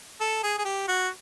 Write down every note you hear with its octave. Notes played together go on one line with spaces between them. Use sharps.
A4
G#4
G#4
G4
F#4